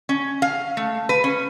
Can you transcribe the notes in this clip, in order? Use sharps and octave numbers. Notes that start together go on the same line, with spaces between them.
C#4
F5
A3
B4
C#4